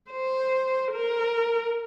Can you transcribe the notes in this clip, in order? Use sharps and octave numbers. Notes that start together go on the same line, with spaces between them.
C5
A#4